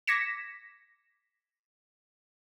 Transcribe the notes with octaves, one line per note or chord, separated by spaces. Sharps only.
D6 G#6 A#6 B6 C#7 E7